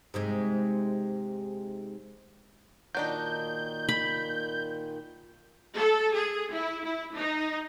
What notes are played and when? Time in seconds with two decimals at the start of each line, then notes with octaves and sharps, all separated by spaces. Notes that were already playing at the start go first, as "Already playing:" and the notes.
0.14 G#2 C3 G#3
2.95 A#2 D#3 F#3 D4 D#4 G6
3.89 B5
5.77 A4
6.14 G#4
6.54 E4
6.85 E4
7.16 D#4